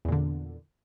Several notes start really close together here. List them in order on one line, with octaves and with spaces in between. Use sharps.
E2 A#2 D3